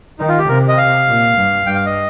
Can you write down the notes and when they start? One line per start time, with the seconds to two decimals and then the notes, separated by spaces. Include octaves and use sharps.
0.19 D#3 D#4
0.29 F4
0.38 G4
0.48 C3 A#4
0.68 D#5
0.77 F5
1.07 A#2
1.36 G2
1.66 G2 G5
1.75 F5
1.86 D#5